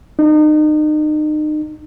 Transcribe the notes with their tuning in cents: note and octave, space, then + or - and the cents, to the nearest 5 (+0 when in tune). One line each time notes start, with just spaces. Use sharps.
D#4 -35